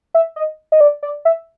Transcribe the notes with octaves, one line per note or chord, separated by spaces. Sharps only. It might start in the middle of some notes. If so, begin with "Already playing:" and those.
E5
D#5
D#5
D5
D5
E5